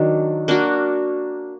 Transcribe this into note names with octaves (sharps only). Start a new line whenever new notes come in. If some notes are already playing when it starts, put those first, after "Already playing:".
Already playing: D#3 F#3 D4
A#3 D4 F#4